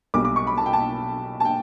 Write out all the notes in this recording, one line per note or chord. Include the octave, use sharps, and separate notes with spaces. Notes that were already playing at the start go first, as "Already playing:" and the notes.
B1 B2 G3 D6
D6
C#6
B5
A5
G5
A5
A5
G5